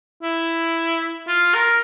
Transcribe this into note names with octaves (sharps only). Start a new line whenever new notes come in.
E4
F4
A#4